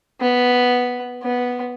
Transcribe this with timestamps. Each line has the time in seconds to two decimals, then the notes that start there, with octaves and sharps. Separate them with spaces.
0.21 B3
1.23 B3